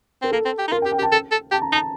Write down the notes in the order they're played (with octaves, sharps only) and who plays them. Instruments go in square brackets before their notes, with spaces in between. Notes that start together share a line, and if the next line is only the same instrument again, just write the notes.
[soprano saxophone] C4 [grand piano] A#4
[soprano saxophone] A#3 [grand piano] A4
[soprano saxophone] C4
G4
D#4
[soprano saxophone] F4 [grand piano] A#4
[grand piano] G5
[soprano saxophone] G4
[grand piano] G5
[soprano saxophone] G4
[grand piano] A5
[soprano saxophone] A4
A4
[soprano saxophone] G4 [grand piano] A5
[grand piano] A#5
[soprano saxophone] D#4 [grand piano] A5